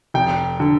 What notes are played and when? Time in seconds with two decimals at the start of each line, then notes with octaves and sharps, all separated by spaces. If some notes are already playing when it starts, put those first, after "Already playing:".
0.14 F1 G5
0.60 D3